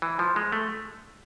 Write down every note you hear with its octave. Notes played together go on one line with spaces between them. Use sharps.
E3
F3
G#3
A3